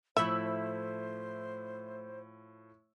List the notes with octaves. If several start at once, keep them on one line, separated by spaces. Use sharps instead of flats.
A2 F3 A3 E4 C5 E5 E6